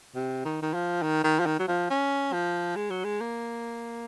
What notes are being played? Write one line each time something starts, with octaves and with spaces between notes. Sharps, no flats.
C3
D#3
D#3
F3
D#3
D#3
F3
D#3
F#3
F3
C#4
F3
G#3
F#3
G#3
A#3